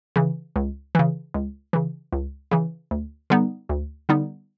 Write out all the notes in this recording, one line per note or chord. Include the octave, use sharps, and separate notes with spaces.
C#3 E3
C#2
C#3 E3
C#2
C#3 E3
C#2
C#3 E3
D2
D3 G3 B3 D#4
D2
D3 G3 B3 D#4